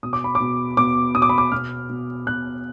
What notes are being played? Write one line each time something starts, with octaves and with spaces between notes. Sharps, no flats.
B2 D#6
D6
B5
D6
B2
B2 D6
B2 D#6
D6
B5
D6
B2 F6
B2
B2 F#6